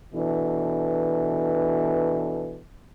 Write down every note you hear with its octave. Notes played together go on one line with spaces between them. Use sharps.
B2 E3 D4 A4